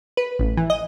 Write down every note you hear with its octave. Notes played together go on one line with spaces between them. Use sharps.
B4
A1
E3
D#5